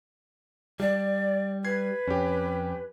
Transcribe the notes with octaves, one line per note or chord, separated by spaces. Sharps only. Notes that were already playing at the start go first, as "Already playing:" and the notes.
G3 D5
B4 G#6 C7
F2 C#4 G4